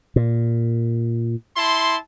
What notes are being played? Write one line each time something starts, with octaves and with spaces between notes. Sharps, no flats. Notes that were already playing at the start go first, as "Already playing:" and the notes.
A#2
E4 A5 C6